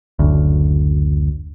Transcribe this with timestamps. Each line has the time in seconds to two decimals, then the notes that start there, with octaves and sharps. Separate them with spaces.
0.19 F#1 D2